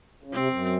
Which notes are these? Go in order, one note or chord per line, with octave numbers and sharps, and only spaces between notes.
C#3
C3 C4
F#2